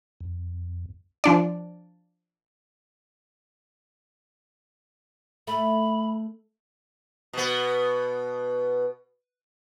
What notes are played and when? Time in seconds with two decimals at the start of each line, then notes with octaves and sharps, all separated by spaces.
0.20 F2
1.24 F3 D4 D5
5.47 A3 B5
7.33 B2 B3